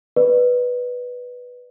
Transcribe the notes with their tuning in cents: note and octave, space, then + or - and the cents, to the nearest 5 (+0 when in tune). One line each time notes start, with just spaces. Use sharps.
B4 +0 D5 +30